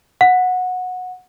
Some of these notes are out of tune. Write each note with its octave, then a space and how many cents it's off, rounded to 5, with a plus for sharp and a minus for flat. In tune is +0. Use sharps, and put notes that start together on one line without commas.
F#5 -15